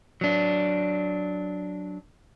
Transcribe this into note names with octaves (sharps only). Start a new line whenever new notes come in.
F#3 D4